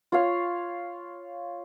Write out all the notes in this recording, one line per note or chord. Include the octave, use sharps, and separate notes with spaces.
F4 C#5 F5